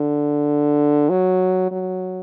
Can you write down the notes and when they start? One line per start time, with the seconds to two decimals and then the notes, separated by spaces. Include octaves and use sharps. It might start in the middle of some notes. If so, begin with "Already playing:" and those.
Already playing: D3
1.10 F#3
1.71 F#3